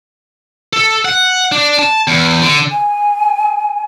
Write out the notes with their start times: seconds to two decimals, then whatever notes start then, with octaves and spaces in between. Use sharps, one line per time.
0.73 A4
1.05 F#5
1.52 D4
1.79 A5
2.08 E2
2.42 D3
2.70 G#5